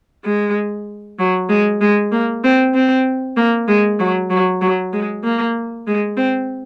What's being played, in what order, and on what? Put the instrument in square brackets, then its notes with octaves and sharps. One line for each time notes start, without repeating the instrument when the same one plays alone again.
[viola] G#3
F#3
G#3
G#3
A#3
C4
C4
A#3
G#3
F#3
F#3
F#3
G#3
A#3
G#3
C4